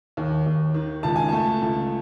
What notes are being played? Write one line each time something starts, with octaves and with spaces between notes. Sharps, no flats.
D#2
D#2
D#3
C#2 A5
G#5
A3 A5
C#2